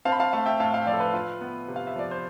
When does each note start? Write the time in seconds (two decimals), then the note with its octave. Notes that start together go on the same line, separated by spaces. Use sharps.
0.05 C4 F5 A5
0.12 B5
0.20 F5 A5
0.33 A3 F5 A5
0.46 E5 G5
0.60 A2 F5 A5
0.73 F5 A5
0.81 G5
0.87 F3 D5 F5
0.94 A4
1.00 B4
1.14 F4
1.41 B3
1.68 C3
1.76 F5
1.87 E5
1.96 F3 D5
2.11 C5